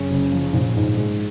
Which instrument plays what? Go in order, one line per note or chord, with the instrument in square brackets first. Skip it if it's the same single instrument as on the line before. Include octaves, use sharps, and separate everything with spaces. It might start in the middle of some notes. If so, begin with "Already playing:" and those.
Already playing: [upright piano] F#2 [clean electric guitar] C#3 C#4
[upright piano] F#1
F3
A#1
G#2
G#3